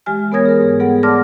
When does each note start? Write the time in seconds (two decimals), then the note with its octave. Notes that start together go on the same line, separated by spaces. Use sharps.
0.06 E3 G#3 G4 G#5 F6
0.32 B3 A#4 C#5 D#6 G#6 A#6
0.46 G#4 A#4
0.61 G#2
0.80 G3 B3 G#4 A4 F#5
1.03 D5 A5 C6 D6 F6 A#6